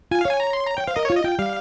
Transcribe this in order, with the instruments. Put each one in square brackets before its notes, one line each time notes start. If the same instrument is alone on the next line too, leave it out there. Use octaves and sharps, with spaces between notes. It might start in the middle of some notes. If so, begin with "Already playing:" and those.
[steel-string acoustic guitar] F4 [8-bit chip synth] G#5
[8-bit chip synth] F5
[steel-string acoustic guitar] C#5 [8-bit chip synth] G#5
[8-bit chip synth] A#5
C6
A#5
[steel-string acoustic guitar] C#5 [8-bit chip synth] G5
[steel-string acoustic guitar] C5 [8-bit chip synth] F5
[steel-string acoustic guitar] A#4 [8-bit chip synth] D#5
[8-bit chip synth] C#5
[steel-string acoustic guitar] F4
[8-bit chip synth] D#5
[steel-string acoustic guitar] F4 [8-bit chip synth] G5
[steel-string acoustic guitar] G3 [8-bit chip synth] F5